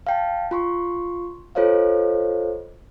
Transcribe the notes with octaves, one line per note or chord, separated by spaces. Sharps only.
F5 G5 A5
F4 C6 C#6
F4 A4 C5 C#5 D#5 F5